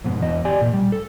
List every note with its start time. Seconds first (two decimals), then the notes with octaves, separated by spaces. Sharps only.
0.04 F2 G#2 B2
0.20 E2 D#5
0.45 G4 D5 G#5
0.61 A#2
0.73 G3
0.92 A4